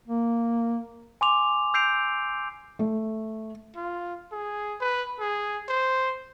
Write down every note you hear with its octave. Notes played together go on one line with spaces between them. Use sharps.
A#3
G#5 C6 D6 F7
E6 G6 C7 D7 F7
A3
F4
G#4
B4
G#4
C5